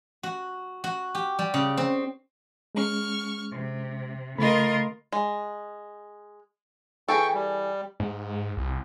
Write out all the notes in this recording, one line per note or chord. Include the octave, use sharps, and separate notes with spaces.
F#4
F#4
G4
G3
C#3
C4
G#3 C#4 C#6 F6
C3
C#3 A3 F4 A#4 D#5 B5
G#3
E3 G#4 A4 G5 C#6
G3
G#2
C2